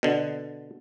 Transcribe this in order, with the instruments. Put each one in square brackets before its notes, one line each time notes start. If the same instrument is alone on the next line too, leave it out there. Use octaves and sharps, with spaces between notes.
[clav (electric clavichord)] B2 D3